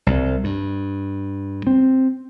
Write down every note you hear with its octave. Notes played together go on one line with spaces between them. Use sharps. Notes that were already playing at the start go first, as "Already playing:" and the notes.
C2
G2
C4